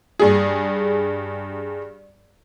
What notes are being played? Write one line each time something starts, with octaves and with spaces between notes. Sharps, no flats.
G2 G#4